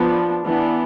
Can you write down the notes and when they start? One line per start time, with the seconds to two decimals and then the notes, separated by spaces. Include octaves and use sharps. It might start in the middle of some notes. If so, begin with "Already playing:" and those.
Already playing: F3 B3 D4
0.45 E3 B3 D4